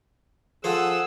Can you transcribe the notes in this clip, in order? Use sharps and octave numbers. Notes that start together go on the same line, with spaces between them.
F3 G#4 A4 C5 F#5 E6